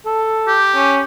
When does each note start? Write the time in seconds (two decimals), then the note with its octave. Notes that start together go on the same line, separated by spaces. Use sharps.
0.06 A4
0.48 G4
0.76 C#4